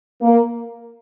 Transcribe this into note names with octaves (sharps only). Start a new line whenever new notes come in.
A#3